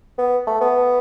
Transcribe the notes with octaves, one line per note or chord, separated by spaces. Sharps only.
B3
A3
B3